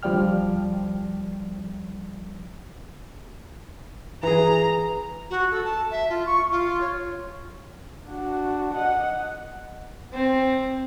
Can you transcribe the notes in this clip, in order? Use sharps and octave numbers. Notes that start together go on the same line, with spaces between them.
D2 F3 G3 D5 G5 F6
E3 G#4 A#5
F#4
A4
A5
E5
F4
C#6
F4
C#5
D4 F#4
D#5 F#5
C4